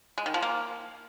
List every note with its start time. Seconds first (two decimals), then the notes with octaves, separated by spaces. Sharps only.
0.18 G#3
0.26 D#3
0.34 F3
0.42 A#3